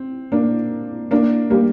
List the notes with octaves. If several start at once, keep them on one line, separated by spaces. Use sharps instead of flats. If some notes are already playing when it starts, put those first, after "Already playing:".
Already playing: C4
A#3 D4
A#3 D4
G3 A#3